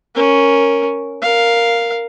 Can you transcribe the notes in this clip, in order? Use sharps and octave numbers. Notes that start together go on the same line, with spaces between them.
C#4 A#4
A#4 F5